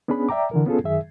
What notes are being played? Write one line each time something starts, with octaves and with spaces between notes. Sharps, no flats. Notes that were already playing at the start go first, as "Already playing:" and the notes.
B3 C#4 D4 G#4 B5
D5 E5 G5 A#5 D6
D3 E3 A#4
B3 C#4 F4 G#4 A4
F#2 D#3 G#4 E5